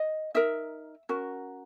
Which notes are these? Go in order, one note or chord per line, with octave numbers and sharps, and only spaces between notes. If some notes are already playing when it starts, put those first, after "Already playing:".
Already playing: D#5
D#4 A#4 E5
C#4 F#4 A#4